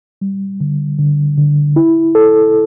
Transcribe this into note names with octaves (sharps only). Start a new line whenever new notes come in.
G3
D3
D3
D3
E4
A4